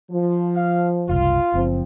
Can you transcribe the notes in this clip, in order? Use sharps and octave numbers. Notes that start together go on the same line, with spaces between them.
F3
F5
F#1 C2 F4
F#1 F3 C4